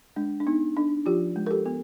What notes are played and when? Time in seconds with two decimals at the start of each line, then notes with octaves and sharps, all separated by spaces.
0.16 G#3 D4
0.40 D4
0.47 B3 D#4
0.77 D4
1.06 F3 F4 G4
1.36 G#3
1.46 A#4
1.51 G4 A4
1.66 B3